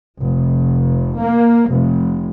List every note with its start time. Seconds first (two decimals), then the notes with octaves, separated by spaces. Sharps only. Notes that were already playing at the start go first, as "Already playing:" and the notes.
0.23 F1
1.20 A#3
1.73 F1